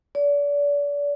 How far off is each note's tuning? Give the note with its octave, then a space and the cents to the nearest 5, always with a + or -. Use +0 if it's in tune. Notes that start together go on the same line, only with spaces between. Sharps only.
D5 -35